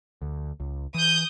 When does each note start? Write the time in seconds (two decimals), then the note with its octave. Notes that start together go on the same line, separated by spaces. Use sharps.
0.22 D2
0.60 C#2
0.94 E3 D#6 G6